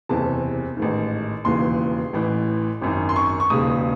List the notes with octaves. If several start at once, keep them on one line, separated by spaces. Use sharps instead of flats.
F#1 E2 C3 E3 A5
A1 G#2 D#3
E1 D#2 C#3 E3 C6
A1 A2 E3
G#1 F#2 D#3
C6
C#6
C#6
E1 D#2 C#3 D#6